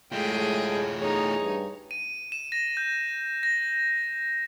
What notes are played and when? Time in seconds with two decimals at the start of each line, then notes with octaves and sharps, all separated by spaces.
0.12 A2 G#3 A3 F4 G#4 G5
0.99 E2 D#4 G#4 C#5
1.39 G2
1.91 D#7
2.32 E7
2.52 A#6
2.77 G6
3.43 A#6